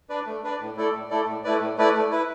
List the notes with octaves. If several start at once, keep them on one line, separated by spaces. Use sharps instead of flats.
D4 B4 D5
A3
D4 B4 D5
A2
A3 E4 A4 D5
A2
A3 E4 A4 D5
A2
A3 E4 B4 D5
A2
A3 E4 B4 D5
A3
E4 B4